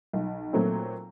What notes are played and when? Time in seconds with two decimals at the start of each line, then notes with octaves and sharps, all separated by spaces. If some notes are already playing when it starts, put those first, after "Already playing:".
0.13 B1
0.53 A#2 F#3 A3 C4